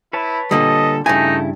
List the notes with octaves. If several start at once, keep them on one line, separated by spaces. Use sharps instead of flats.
E4 B4 C#5 A5
A#2 D3 G3 A4 D#5
G2 C#3 A3 D#4 E4 G#5